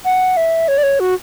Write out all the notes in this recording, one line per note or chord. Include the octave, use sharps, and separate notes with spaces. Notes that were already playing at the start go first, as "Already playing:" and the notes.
F#5
E5
C#5
D5
C#5
F#4